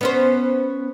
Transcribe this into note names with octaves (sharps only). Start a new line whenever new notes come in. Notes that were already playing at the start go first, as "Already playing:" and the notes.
B3 C#4 C5